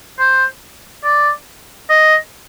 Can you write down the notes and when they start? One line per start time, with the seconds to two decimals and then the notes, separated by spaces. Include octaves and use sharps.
0.19 C5
1.04 D5
1.90 D#5